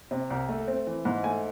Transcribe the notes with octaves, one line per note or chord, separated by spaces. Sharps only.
C3
C2
A3
C4
E3
G#2
A3 G#5